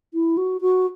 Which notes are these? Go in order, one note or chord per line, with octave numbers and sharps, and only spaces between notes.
E4
F#4
F#4